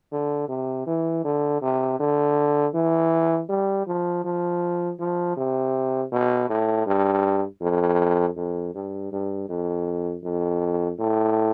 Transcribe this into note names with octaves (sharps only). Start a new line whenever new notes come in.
D3
C3
E3
D3
C3
D3
E3
G3
F3
F3
F3
C3
B2
A2
G2
F2
F2
G2
G2
F2
F2
A2